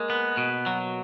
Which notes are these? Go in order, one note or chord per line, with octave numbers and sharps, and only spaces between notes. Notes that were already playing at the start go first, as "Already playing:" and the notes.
Already playing: G#3 A#3
B3
B2
F#3